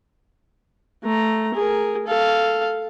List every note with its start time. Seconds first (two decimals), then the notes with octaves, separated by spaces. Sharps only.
1.04 A3 A#5
1.55 G#4 A#4
2.07 A4 F5